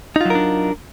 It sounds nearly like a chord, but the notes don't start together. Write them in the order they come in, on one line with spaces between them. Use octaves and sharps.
D#4 F4 F#3 A#4 D4